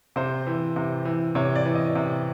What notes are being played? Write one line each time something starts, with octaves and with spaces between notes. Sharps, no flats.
C3 C5
E3
C3
E3
C3 C#5
D5
E3
D#5
C3